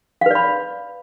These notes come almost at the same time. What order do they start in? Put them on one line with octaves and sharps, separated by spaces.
F5 B4 D5 B5